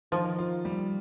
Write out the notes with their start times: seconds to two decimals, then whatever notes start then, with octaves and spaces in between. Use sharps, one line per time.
0.12 D#3 F3
0.39 F4
0.65 G3